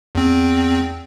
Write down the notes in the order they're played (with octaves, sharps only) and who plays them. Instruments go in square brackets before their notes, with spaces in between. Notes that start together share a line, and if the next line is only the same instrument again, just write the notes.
[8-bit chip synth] E2 C4